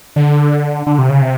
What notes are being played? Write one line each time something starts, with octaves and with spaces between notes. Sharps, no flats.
D3
D3
C3
C#3
C3